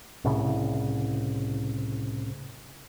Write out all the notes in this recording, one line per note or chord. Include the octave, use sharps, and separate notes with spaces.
C2 A2 C#3